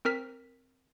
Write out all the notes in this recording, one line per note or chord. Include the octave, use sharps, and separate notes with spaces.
C4 A#4 F6 B6